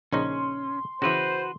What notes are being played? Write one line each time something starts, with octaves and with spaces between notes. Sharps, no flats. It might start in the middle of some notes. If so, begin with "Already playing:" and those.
A#1 C#3 C#4 D#4 C6
C#3 E3 F#4 B4 C5